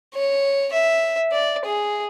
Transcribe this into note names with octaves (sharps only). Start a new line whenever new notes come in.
C#5
E5
D5
G#4